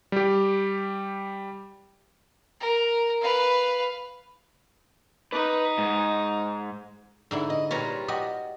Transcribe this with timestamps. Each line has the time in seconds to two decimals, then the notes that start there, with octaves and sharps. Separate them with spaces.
0.12 G3 G4
2.61 A#4
3.21 B4 F5
5.32 D#4 B4
5.78 G#2
7.31 G#2 D3 E4
7.50 D#5
7.71 A#2 G3 F4 B4 C#5 A#5
8.08 F#4 G4 D#5